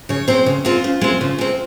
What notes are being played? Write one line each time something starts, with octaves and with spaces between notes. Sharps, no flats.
C#3 C#5
G#3 C4 C5
C#3
G#3 C4 F4
C#3
G#3 C4
C#3
G#3 C4